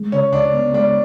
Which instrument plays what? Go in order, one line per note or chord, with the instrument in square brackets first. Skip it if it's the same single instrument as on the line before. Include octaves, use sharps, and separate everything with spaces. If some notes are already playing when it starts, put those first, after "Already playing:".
Already playing: [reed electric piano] G#3
[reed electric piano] C#3 [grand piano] C#4
[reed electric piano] C#2 [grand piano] D4
[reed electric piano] B3
[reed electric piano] G#3 [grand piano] D4